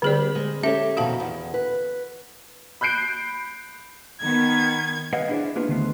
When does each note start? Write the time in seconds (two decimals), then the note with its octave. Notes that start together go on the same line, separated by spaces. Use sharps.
0.02 D3 G3 C4 G4 G#4 D5
0.35 G#3 C4
0.63 C#4 G4 A4 C#5 E5
0.97 F2 B2 D#3 F#4 F5 A5
1.20 E2
1.54 B4
2.81 B5 F#6 G6 C7 D7
4.21 D#3 B3 G#6
5.13 B4 D#5 F5 F#5
5.29 D4 E4 G#4 B4 C5 D5
5.56 A#3 B3 D4 E4 F4 B4
5.68 D2 D#3 A3 B3 C5